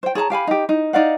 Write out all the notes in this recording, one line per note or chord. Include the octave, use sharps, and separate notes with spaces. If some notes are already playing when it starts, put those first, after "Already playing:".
C5 G5
G#4 C#5 A5 A#5
G4 F5 G#5 B5
D#4 G4
D#4
D#4 D5 F5 F#5